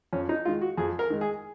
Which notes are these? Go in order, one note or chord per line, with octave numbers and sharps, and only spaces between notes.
F2 C#4
D#4
D#3 G#3 F4
F#4
F2 G#4
A#4
D#3 G#3
G#4